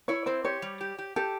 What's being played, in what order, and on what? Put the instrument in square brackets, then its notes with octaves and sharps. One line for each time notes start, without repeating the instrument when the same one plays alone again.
[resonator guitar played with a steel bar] E4 [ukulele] C#5
[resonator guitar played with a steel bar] C4 [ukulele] C5
[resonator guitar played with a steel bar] G4 [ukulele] C#5
[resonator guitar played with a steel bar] G3
G4
G4
[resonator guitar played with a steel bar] G4 [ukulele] A4